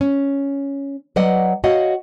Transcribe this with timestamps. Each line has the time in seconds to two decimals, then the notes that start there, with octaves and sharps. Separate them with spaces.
0.01 C#4
1.16 F#3 B4 D5 D#5 F#5
1.64 F#4 C#5 D#5 F5 F#5